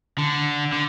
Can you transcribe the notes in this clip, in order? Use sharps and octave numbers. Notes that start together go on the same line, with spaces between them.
D3
D3